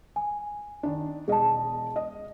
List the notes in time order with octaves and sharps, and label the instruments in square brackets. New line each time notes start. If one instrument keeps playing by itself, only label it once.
[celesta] G#5
[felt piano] D#3 D4
[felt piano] E1 D#5 [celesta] G#4 A5
[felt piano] D#5